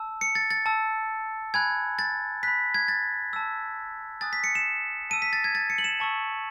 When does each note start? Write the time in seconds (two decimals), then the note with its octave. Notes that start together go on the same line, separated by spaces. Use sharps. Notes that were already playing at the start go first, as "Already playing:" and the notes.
Already playing: A5 E6
0.21 C#7
0.35 A6
0.51 A6
0.66 A5 E6
1.54 G#5 B5 F#6 G#6
1.99 A6
2.43 B5 F#6 B6
2.74 G#6
2.88 A6
3.33 A5 E6
4.21 G#5 D#6 F#6 A6
4.33 B6
4.44 C#7
4.55 E7
5.10 A5 E6 D#7
5.22 B6
5.33 A6
5.44 G#6
5.55 A6
5.70 C#7
5.78 F#7
5.84 E7
6.00 A5 C#6 E6